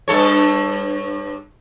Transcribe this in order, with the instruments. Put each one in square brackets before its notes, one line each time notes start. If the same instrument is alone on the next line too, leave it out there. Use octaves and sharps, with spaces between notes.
[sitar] G2 A4 C#5